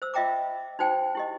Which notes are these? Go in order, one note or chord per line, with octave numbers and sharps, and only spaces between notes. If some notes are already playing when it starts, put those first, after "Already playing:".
C5 E6
F4 D#5 E5 G5 A#5 D6
D#4 F#4 C5 G5 G#5
E4 G4 D#5